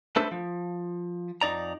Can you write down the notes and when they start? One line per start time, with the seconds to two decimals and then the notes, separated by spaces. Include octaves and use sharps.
0.16 A3 D4 A4 B4 C5
0.32 F3
1.41 F2 D#4 D5 A#5